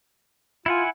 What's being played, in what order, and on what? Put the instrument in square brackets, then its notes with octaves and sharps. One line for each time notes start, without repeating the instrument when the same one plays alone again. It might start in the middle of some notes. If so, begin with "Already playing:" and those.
[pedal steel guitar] E4 F#5 G#5 [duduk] F4